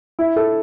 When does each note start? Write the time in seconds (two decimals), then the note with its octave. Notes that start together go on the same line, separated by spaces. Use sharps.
0.19 E4
0.36 A4